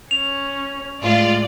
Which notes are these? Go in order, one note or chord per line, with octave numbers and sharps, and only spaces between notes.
C#4 F7
A2 G#3 F4 D5 F5